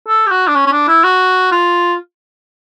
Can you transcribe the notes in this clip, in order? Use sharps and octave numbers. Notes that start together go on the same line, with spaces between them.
A4
G4
F#4
D4
C#4
C#4
D4
E4
F#4
F4